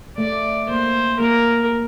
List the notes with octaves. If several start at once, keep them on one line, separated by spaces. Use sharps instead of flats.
A3 D5
A#3 C5
A#3 A#4